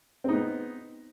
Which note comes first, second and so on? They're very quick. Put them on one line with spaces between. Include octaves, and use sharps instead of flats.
C4 D#4 B3